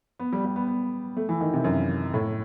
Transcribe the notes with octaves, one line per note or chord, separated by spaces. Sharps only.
B3
G3
G3
B3
B3
A3
E3
D#3
C3
F#2
A2